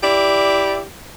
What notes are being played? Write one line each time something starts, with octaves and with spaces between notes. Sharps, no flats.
E4 G4 D5